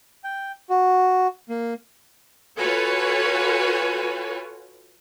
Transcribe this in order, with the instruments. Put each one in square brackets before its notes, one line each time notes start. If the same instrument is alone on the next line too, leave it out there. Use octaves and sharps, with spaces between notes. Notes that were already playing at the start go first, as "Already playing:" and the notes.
[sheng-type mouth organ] G5
F#4
A#3
[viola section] F4 F#4 A4 B4 C#5 G#5